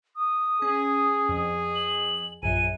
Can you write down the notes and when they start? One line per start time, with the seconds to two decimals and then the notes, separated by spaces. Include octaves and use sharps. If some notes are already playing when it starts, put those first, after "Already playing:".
0.16 D#6
0.62 C#4 G#4
1.29 F2
1.75 F#7
2.43 A#1 F#2 G#5 D#7